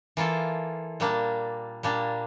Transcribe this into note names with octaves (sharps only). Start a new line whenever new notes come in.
E3 A#3 F4 A4
A#2 G3 A#3 D4
A#2 G3 A#3 D4